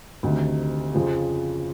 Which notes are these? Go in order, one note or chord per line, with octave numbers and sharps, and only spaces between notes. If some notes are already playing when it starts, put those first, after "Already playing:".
D2 C3 D#3
F2 C#3 F3